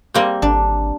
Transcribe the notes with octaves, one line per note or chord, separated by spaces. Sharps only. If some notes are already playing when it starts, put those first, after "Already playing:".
G3 A#3 C4
G#1 D4